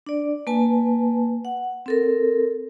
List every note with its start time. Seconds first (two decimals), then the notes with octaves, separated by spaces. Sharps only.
0.06 D4 D5
0.47 A#3 B4 G#5 A5
1.45 F#5
1.86 C4 A4 A#4